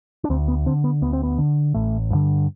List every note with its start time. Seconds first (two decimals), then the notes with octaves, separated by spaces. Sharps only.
0.24 D4
0.30 D2 C4
0.48 B3
0.66 D3 C4
0.84 B3
1.02 D2 B3
1.13 C4
1.23 B3
1.38 D3
1.74 A1 A3
2.10 G2 D3